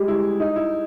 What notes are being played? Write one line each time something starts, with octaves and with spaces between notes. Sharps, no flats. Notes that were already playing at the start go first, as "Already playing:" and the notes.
Already playing: G3 G#3 G4 G#4
E4
D#4
E4